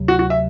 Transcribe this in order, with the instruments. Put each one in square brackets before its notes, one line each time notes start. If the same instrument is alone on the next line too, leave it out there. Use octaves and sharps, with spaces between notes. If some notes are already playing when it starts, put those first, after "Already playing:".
Already playing: [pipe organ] D2 C3 F#3
[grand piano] F#4
F#4
E5